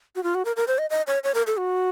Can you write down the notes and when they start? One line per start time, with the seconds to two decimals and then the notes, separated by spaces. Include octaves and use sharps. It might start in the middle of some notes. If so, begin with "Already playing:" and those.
0.16 F#4
0.23 F4
0.35 F#4
0.45 A#4
0.56 A#4
0.68 C5
0.78 D#5
0.90 D#5
1.07 C#5
1.24 C#5
1.35 A#4
1.47 A4
1.58 F#4